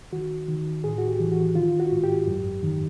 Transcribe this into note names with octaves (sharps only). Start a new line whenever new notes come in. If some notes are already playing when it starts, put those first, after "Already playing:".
D#3 F#4
D#3
A2 G#4
F#4
G4
E3
F#4
D#3 F4
F#4
G#2
G4
F#2
D#3